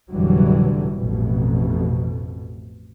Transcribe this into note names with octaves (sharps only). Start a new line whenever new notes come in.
F1 A#2 D3 E3 F#3 G3
A1 F2 B2